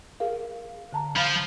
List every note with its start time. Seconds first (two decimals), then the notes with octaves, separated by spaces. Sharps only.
0.20 G#4 A#4 F5
0.93 D3 A5 A#5
1.16 F3 F5 B5